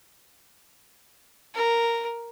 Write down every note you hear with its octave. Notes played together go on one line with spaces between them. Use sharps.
A#4